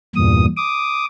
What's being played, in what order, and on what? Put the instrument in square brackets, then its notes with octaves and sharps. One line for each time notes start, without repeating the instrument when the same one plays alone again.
[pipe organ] E2 G2 A#2 D#6
D6 D#6